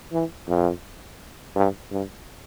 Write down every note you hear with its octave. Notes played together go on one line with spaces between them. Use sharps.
E3
F2
G2
G2